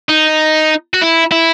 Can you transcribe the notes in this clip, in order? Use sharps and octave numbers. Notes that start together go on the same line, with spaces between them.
D#4
F#4
E4
E4